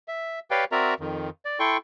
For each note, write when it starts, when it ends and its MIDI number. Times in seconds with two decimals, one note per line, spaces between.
0.08 0.39 76
0.51 0.65 67
0.51 0.65 71
0.51 0.65 73
0.51 0.65 74
0.51 0.65 77
0.51 0.65 79
0.72 0.94 60
0.72 0.94 66
0.72 0.94 70
0.72 0.94 74
0.72 0.94 76
0.72 0.94 82
1.00 1.30 41
1.00 1.30 51
1.45 1.59 74
1.60 1.77 64
1.60 1.77 69
1.60 1.77 79
1.60 1.77 84
1.60 1.77 85